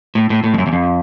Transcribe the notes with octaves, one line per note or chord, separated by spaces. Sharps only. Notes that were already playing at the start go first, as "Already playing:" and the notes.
A2
A2
A2
F2
F#2
E2
F2